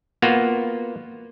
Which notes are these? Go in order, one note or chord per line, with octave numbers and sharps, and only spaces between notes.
A#3 B3 F4 F#4